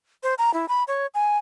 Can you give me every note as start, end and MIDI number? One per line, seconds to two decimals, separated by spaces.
0.23 0.34 72
0.38 0.53 82
0.54 0.68 64
0.69 0.84 83
0.88 1.06 73
1.14 1.37 80